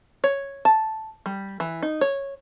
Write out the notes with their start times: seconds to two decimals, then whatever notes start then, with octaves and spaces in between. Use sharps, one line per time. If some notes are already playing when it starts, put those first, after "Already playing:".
0.24 C#5
0.65 A5
1.26 G3
1.60 E3
1.82 D#4
2.01 C#5